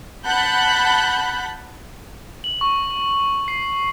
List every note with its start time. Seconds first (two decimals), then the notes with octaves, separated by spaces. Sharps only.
0.25 F#5 A5 B5 F#6 G6 B6
2.44 F#7
2.61 C#6
3.48 C7